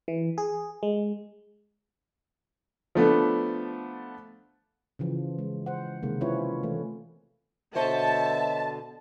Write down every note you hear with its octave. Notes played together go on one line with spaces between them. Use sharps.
E3
G#4
G#3
F3 A3 B3 D4
C#3 E3 F3
G#3
C5 F#5
C3 D#3 G#3 A#3
C4 C#4 E4 F4 B4 C#5
E3 A3
B2 D3 C5 C#5 D#5 E5 A5